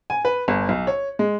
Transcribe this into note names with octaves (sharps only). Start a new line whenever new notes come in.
G#5
B4
G1
B1
C#5
G#3